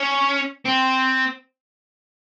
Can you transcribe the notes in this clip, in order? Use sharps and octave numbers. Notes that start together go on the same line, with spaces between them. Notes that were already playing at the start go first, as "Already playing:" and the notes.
Already playing: C#4
C4